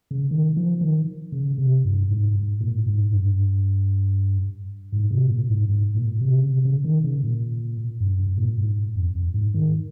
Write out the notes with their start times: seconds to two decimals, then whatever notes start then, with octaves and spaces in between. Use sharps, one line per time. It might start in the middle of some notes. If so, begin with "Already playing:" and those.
0.11 C#3
0.31 D#3
0.56 F3
0.81 D#3
1.32 C#3
1.58 C3
1.85 G2
2.09 G#2
2.36 G#2
2.61 A#2
2.87 G#2
3.12 G2
4.92 G#2
5.11 C3
5.30 A#2
5.50 G#2
5.69 G#2
5.95 A#2
6.21 C3
6.38 C#3
6.46 C3
6.65 C#3
6.85 D#3
7.04 C#3
7.23 A#2
8.00 G2
8.19 G2
8.38 A#2
8.58 G#2
8.96 F2
9.15 F2
9.34 G#2
9.54 D#3